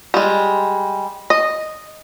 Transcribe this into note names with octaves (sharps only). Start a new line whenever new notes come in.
G3 G#3
D#5